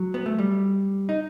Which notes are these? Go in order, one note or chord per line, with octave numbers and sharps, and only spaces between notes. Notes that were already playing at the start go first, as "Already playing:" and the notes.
Already playing: F#3
B3
A3
G3
D#4